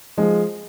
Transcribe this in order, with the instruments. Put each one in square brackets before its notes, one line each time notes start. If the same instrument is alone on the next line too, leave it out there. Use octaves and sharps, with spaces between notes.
[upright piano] F3 G#3